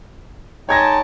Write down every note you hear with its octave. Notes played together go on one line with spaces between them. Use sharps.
G#3 D#4 C#5 G5 A5 G#6 A#6